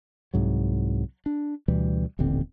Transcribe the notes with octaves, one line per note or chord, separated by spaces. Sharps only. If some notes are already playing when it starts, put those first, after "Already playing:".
C2 G#2 F#3
D4
D2 B2 E3 G3
D#1 A1 D3 C4